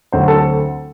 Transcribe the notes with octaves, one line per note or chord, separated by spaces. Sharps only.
D2 D3 F#3 C4 C5
A4